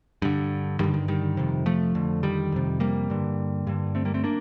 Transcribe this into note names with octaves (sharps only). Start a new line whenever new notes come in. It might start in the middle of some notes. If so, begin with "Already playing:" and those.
G2 D3
G2 D3 D#3 G3
D#3
D#3 G3
F2 C3
F3 A3
F2 D3
D#3 G3
F2 C3
G3 A#3
G2 D3
G2 D3
A3 C4
G3 A#3
A3 C4
A#3 D4